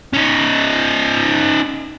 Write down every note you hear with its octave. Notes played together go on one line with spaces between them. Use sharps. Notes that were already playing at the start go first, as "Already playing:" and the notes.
C#4 D#4